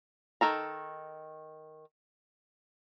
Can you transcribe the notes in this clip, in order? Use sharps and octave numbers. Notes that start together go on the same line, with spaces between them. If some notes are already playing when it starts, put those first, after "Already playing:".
D#3 A4 A#5